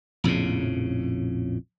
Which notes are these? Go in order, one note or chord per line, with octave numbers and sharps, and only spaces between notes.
A#1 F2 A2 C#3